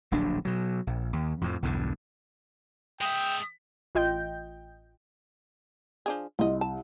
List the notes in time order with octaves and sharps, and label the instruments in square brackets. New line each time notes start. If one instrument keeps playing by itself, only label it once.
[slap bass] D1 A#1 F#3 D4
B2 F#3
A#1
D#2
F2 A2 F3
B1 E2 G2 D3
[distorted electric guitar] G#3 E5 [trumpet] G5 [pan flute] D#6
[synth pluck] A1 F4 D#5 G5 G6
[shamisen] F3 D4 G#4
[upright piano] C2 [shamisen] F4 D#5
[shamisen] A5